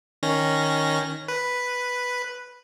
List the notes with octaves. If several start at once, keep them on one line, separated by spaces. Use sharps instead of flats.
D#3 C#4 A#6
B4